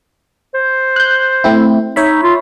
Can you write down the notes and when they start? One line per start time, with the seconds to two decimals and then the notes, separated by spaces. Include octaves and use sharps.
0.54 C5
0.96 F#6 G6
1.44 A3 C4 E4
1.96 D#4 C#5 E5 B5
2.23 F4